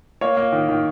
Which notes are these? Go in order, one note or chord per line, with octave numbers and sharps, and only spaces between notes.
A#3 C#5
A#3
D#3
D#3